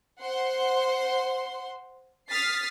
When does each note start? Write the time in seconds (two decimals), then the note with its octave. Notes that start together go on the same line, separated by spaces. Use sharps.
0.20 C5 F#5 C6
2.28 D#6 F6 A6 B6 C7